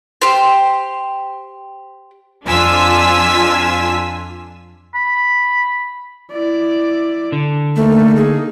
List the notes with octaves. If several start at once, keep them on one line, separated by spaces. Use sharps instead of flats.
G4 C5
F2 D4 F4 G#5 E6 B6
B5
E4 D5
D3
A3 A#3 D#4
G#4